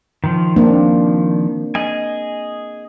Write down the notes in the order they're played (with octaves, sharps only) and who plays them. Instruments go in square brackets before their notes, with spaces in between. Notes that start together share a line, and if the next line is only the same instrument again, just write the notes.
[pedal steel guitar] D#3 F3
[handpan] A#3 C4 D4
[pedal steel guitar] G#4 D#5 G#5